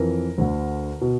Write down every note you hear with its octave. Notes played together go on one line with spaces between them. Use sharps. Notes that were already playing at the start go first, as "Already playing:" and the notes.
Already playing: F2 E3 A#4
D2 D3
B2